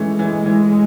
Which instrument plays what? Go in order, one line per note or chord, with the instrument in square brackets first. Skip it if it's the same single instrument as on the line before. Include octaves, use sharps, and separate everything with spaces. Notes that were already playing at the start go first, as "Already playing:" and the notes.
Already playing: [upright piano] E3 A3 C#4 [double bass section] G#3
[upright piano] E3
E3